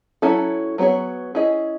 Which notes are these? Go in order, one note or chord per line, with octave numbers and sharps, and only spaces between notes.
F#3 C#4 E4 A4
F#3 B3 D#4 G#4 C#5
C#4 E4 G#4 D#5